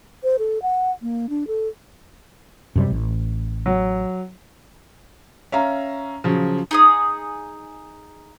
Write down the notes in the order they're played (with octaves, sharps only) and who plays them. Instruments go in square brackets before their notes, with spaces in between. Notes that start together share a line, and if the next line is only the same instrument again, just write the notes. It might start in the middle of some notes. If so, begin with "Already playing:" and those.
[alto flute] C5
A4
F#5
A#3
D4
A4
[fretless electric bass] F#2 C3 G3
A1
[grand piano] F#3
[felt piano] C#4 E5 F5 A#5
C#3 F3 F#3
[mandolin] D#4 G#4 D#6